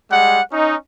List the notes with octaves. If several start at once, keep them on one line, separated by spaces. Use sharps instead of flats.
G3 G#3 F#5
C#4 D#4